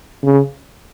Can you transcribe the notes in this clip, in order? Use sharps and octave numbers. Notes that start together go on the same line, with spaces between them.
C#3